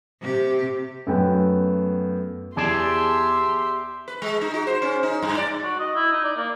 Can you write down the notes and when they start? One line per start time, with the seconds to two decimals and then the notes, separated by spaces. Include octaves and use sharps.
0.21 C3 G4
1.07 F#2 A3 B3 G5
2.57 E2 G4 G#4 D5 E5 A5 C6
4.08 B4
4.22 G#3
4.41 D#4
4.54 F#4
4.67 C5
4.82 C#4
5.03 D#4
5.22 G2
5.37 D5
5.64 F#4
5.79 D#5
5.95 E4
6.12 D#4
6.24 D5
6.37 A#3